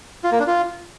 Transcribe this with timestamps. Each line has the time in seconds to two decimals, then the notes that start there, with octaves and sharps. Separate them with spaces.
0.24 F4
0.31 A#3
0.39 D4
0.47 F4